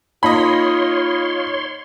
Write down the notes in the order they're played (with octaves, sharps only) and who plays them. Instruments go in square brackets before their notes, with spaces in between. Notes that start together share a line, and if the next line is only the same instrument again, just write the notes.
[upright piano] A#3 D#4 [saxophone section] F4 [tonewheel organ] C#5 C6 [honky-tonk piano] D#5 B5